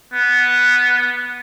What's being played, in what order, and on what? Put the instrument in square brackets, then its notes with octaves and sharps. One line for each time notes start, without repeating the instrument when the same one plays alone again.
[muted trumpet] B3